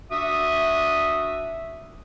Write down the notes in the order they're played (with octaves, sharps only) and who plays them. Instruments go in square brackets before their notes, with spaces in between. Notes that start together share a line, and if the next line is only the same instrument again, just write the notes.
[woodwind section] D4 F#4 E5 [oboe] D#6